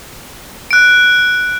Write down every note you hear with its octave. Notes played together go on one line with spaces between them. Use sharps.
F#6 D7